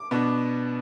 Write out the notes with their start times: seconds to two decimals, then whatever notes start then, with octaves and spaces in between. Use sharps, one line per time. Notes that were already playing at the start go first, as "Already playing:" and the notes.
Already playing: D6
0.11 B2 B3 D4